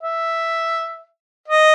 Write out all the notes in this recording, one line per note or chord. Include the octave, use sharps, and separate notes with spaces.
E5
D#5